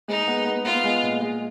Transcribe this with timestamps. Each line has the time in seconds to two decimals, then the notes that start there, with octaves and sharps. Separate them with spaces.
0.08 G#3 D#4
0.27 B3
0.45 B3
0.65 B3 F4
0.84 G#3
1.02 A#2
1.21 G#3